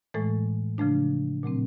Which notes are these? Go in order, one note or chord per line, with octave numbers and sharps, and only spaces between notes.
A2 E3 G#3 A3 A4
C#3 F3 A3 D4
A#2 F#3 A3 C4